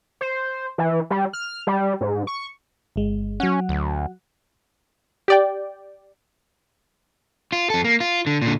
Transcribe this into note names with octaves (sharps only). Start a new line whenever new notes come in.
C5
E3
G3
F6
G3
G#2
C#6
G1 G#3
F#3 C#4 F#5
D2
G4 D5 G5
F4
F2 A4
A#3
F4
D3
A#2 D3